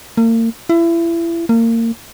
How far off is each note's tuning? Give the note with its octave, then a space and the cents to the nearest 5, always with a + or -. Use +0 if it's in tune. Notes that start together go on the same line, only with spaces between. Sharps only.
A#3 -40
E4 +30
A#3 -30